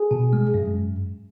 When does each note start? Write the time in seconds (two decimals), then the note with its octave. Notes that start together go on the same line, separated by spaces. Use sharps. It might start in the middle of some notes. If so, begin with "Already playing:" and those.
Already playing: G#4
0.11 B2
0.33 G#3
0.54 F#2